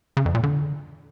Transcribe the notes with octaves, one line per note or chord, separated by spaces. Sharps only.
C#3
F2
A#2
D3